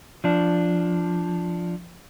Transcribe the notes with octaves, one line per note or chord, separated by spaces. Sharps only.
F3 D4